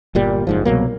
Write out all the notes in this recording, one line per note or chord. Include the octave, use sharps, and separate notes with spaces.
G1 A#2 G3
F#1 G#2 F3
C2 B2 F#3 A#3